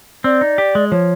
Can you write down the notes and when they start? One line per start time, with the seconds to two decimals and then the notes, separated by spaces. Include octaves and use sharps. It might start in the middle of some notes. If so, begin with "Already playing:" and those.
0.24 C4 D5
0.41 D#4
0.58 G4
0.75 G#3
0.92 F3 C#5